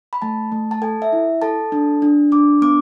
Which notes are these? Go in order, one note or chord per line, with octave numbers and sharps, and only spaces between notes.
B5
A3 A5
A3
A5
A4 G#5
E5
E4
A4 A5
D4
D4
D4 D6
B3 D6